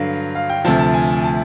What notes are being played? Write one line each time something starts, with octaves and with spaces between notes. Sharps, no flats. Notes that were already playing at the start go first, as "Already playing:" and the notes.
Already playing: G2 D3 F#3 F5
F5
G5
D2 C3 F3 A5
A5
G#5
A5